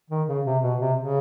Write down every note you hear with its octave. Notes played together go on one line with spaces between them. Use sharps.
D#3
C#3
C3
B2
C3
C#3